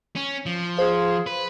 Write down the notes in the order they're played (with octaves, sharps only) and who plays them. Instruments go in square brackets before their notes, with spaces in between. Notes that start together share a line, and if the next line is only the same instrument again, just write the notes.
[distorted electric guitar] C#4
F3
[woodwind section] F4 G#4 [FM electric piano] C5
[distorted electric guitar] B4